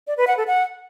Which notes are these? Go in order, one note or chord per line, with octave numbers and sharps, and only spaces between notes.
D5
B4
F#5
A4
F#5